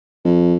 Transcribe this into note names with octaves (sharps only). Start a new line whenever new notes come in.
F2